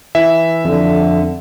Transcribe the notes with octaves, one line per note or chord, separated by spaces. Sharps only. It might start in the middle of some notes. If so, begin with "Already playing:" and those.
E3 E5
F2 D3